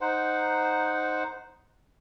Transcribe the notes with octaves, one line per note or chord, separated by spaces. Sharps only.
D#4 C5 F#5